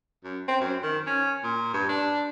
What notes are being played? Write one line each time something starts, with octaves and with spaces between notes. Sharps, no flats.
F#2
C4
F#2
D#3
C#4
A#2
G2
D4